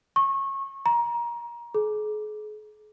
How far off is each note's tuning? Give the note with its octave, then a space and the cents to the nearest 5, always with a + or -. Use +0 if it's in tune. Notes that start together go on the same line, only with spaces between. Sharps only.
C#6 -25
A#5 +25
G#4 +40